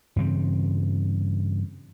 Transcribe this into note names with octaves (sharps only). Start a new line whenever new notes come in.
G2 C#3 E3 C4